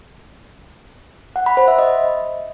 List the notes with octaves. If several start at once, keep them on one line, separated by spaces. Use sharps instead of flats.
F#5
B5
C5
E5
D#5